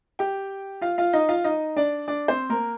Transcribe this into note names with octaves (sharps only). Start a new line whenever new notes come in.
G4 G5
F4 F5
F4 F5
D#4 D#5
F4 F5
D#4 D#5
D4 D5
D4 D5
C4 C5
A#3 A#4